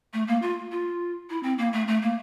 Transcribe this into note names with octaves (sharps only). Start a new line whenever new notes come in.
A3
A#3
F4
F4
E4
C4
A#3
A3
A3
A#3